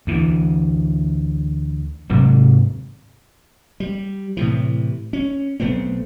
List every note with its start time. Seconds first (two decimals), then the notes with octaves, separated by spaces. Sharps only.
0.07 D2 E3
2.10 G#2 C3 D#3 F#3
3.80 G3
4.37 A2 C3 E3
5.13 C#4
5.60 B1 A3 B3 C4